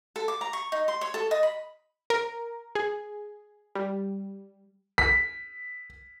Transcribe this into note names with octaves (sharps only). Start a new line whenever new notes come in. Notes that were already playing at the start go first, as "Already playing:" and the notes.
A4
D6
A#5
C#6
D#4
C6
C#5
A4
D#5
B5
A#4
G#4
G3
B6